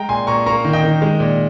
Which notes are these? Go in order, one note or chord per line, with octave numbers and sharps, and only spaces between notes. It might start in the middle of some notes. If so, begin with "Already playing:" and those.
Already playing: G#3 G5 A#5
A#2 G#5 C6
A#2 A#5 C#6
A#3 A#5 C#6
D#3
D#5 G5
D#3
G#3
A#2